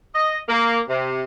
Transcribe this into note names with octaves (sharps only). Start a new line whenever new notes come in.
D#5
A#3
C3